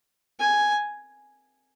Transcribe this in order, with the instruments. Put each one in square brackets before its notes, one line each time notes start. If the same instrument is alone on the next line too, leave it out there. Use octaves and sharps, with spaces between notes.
[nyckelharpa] G#5